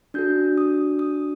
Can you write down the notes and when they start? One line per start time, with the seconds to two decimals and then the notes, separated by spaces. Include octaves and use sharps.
0.14 D4 F#4 A4 G6
0.58 D#6
0.99 D#6